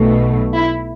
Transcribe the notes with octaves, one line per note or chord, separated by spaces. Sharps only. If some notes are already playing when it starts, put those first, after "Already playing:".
Already playing: B1 B2 A3
E4